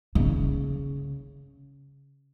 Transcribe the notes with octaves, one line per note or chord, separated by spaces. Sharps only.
C#3